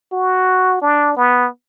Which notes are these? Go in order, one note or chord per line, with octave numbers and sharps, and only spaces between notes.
F#4
D4
B3